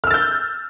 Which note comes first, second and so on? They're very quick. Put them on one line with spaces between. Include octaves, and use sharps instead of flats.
F6 E6 A6 G6